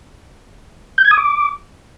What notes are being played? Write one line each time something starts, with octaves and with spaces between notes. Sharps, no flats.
G6
G#6
D#6
D6